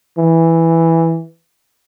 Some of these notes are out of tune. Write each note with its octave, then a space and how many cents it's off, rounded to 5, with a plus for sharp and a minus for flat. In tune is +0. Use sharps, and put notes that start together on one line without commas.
E3 +0